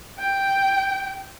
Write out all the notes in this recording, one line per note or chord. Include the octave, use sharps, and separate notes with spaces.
G5